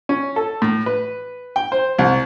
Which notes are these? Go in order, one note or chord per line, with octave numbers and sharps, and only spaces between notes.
C#4
A4
A2
B4
G5
C5
C2